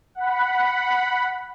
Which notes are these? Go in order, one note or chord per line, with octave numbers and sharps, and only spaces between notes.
F#5 B5